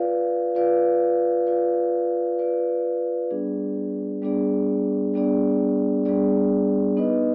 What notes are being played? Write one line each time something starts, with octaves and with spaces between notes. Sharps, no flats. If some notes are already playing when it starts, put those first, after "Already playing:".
Already playing: F4 B4 D5 F5
F4 B4 D5 F5
F4 B4 D5 F5
F4 B4 D5 F5
G3 B3 D4 G#4 D5
G3 B3 D4 G#4 D5
G3 B3 D4 G#4 D5
G3 B3 D4 G#4 D5
B3 D#4 B4 D#5